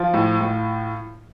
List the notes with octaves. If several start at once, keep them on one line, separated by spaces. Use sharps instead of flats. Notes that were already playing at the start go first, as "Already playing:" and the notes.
Already playing: F3 F4
A2
A2